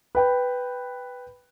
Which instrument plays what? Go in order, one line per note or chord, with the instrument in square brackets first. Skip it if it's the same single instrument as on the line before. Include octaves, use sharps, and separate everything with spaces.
[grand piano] B4 G5 B5